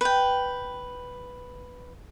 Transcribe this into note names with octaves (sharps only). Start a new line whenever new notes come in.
B4 G5